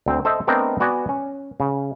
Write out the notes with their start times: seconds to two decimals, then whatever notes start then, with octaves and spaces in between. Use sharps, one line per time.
0.06 D2 C4
0.25 A4 C5 D#5 E5
0.47 A3 B3 C4 D4 A#4 D#5
0.80 B3 F#4 D5 G#5
1.09 C#4
1.60 C#3